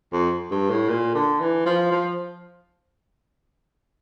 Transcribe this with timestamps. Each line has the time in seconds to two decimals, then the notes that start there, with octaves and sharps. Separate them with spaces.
0.13 F2
0.51 G2
0.70 A2
0.89 A#2
1.15 D3
1.40 E3
1.66 F3
1.92 F3